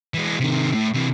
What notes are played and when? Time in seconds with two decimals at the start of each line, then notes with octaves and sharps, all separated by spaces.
0.14 E3 G#3
0.40 C3 D#3
0.75 A2
0.94 C3 E3